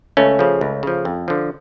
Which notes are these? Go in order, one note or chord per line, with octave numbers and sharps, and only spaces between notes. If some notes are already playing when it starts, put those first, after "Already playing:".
C#2 A3 C#4
C#3 F3
C#2
C#3 F3
F2
D3 F3